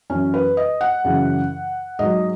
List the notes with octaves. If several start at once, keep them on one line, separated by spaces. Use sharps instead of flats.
F#2 E3 C#4
B4
D#5
F#5
F#2 C#3 E3
G#2 F#3 D#5